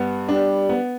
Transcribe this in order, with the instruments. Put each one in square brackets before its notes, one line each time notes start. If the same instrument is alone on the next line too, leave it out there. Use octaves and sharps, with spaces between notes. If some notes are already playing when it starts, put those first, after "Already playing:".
Already playing: [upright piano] G2 B3
[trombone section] G3 [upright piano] D4
[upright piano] B3